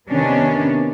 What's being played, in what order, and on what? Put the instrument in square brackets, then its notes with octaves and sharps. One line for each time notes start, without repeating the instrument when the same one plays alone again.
[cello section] C3 D#3 B3 C#4 D4